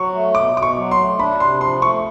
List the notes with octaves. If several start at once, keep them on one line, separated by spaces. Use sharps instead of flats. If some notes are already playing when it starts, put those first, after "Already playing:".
Already playing: F#3 C#6
A3
B2 D6
B2 D6
C#6
F#3
C6
A3
D4 B5
C3 C6
F3 C6
A3 C#6